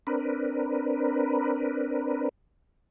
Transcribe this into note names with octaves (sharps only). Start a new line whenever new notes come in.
C4 D4 A#4 B4